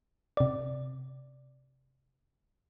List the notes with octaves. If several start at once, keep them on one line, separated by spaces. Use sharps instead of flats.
C3 D5